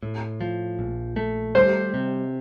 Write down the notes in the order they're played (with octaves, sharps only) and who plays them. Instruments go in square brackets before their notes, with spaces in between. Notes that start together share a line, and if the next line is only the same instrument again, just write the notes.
[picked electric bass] A2
F3
A#1
A3
[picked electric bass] G3 [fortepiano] C5
[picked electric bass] C3